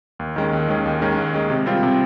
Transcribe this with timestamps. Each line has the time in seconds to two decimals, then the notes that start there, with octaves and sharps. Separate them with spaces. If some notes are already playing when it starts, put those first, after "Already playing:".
0.19 D#2
0.36 D#3 G#3 C#4
0.53 D#2
0.68 D#3 G#3 C#4
0.86 D#2
1.02 D#3 G#3 C#4
1.17 D#2
1.34 D#3 G#3 C#4
1.50 C3
1.66 G3 C4 F4
1.83 C3